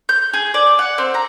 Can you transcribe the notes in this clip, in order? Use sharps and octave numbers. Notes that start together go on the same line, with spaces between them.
G6
G#4
D5
F#5
C4
A#5